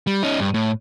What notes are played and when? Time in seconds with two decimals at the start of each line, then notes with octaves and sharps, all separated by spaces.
0.07 G3
0.23 C#4 D#4
0.40 G2
0.54 A2